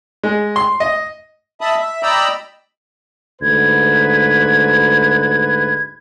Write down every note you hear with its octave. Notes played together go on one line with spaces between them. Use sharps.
G#3
C6
D#5
D#5 E5 A5 B5 D#6
E5
D5 D#5 G5 A#5 B5 E6
D2 G#2 B4 G#6